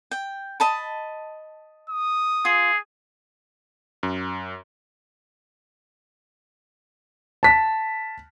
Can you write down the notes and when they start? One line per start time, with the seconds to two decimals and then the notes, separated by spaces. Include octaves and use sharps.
0.11 G5
0.60 D#5 A5 B5
1.90 D#6
2.45 F4 G#4
4.03 F#2
7.43 A5 B6